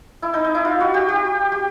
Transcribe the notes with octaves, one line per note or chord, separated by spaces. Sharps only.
E4
D#4
D#4
E4
F4
F#4
G4
G4
G4